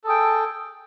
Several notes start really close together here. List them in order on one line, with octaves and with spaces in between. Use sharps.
A4 G#4 G5